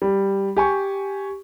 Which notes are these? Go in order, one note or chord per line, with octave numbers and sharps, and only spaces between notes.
G3
G4 G#5 C#6